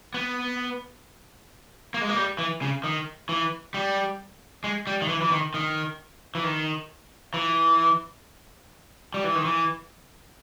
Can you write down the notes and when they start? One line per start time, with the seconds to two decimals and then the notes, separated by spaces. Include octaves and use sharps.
0.14 B3
1.94 A#3
2.01 G#3
2.09 A#3
2.17 G3
2.39 E3
2.62 C#3
2.84 D#3
3.29 E3
3.74 G3
4.64 G#3
4.87 G3
5.02 D#3
5.09 E3
5.22 E3
5.32 D#3
5.54 D#3
6.35 E3
6.44 D#3
7.34 E3
9.14 G3
9.24 E3
9.35 D#3
9.45 E3